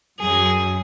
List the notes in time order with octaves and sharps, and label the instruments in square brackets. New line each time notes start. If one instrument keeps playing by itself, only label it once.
[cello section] F#2 [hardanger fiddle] G#4